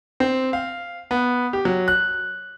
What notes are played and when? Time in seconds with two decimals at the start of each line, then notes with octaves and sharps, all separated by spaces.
0.20 C4
0.53 F5
1.11 B3
1.53 G4
1.65 F#3
1.88 F#6